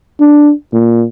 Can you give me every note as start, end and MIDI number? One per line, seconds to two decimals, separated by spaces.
0.20 0.53 62
0.73 1.05 46